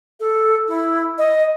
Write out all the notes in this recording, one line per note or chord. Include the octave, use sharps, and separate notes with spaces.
A4
E4
D#5